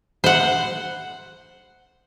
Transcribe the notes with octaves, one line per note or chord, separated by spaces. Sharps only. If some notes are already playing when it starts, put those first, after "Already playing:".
C5 F#5